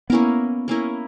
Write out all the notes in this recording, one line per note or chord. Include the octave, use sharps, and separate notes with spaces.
A#3 B3 C#4 E4 A#4
A#3 C#4 E4 A#4